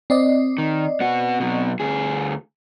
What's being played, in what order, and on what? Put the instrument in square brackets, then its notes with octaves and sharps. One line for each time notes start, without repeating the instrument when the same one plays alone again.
[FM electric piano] C4 D5 D#5
[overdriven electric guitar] D#3
B3 F#4
B2 F#3
D2 G#4